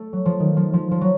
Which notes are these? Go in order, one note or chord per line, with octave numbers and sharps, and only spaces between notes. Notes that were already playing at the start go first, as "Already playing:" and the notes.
Already playing: A3
F#3
F3
D#3
F3
F3
F3
F#3